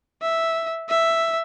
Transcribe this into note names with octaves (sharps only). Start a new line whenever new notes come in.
E5
E5